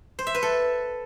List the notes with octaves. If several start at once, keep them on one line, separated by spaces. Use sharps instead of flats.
C5
E5
B4
A4